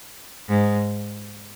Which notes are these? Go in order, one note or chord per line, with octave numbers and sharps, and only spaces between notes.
G#2